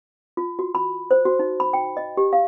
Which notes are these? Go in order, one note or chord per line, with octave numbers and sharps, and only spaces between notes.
F4
F#4
B5
C5
F#4
D#4
B5
G5
D#5
G4
F5